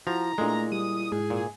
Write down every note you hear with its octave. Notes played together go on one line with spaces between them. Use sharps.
F3 E4 F#4 A#5
A#2 G#3 A3 D4 E4
G3 D#6
G#2 G#4
A#2